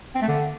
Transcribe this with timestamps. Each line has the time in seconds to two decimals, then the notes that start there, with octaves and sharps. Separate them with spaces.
0.15 C4
0.22 A3
0.28 D3